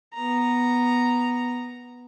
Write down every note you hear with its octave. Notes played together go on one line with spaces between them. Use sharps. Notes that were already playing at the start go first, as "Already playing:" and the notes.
B3 A#5